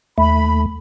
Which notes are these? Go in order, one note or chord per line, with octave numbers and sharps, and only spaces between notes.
D#2 A3 B5